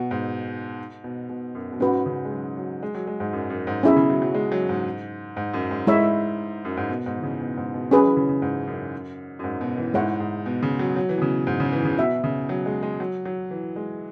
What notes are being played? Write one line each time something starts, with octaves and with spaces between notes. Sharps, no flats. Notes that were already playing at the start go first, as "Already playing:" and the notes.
Already playing: B2 F#4 F#5
G#2
B2
B2
F#2
B2
G#2 C#4 F#4 B4 F#5
C#3
G#3
F#3
F#3
G#3
F#3
G#3
G#2
F#2
F#2
G#2
B2 C#4 E4 G#4 E5
C#3
F#3
F#3
G#3
F#3
G#2
G#2
F#2
G#2
G#3 E4 C#5 E5
F#2
G#2
B2
G#2
E3
C#3
B2
G#2
B2
F#3 C#4 G#4 B4
E3
C#3
C#3
G#2
F#2
F#2
G#2
B2
E3
G#2 G#3 E4 C#5 F#5
G#2
B2
C#3
F#3
F#3
E3
B2
C#3
G#2
C#3
E3
C#3
B2 F#4 E5
C#3
F#3
G#3
G#3
F#3
F#3
E3
G#3